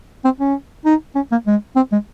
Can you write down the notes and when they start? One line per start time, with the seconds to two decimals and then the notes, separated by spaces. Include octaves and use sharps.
0.25 C4
0.40 C#4
0.85 D#4
1.15 C#4
1.31 A#3
1.47 G#3
1.76 C4
1.92 G#3